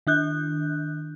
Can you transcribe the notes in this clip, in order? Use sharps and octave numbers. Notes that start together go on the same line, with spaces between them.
D#3 D4 F#6 G6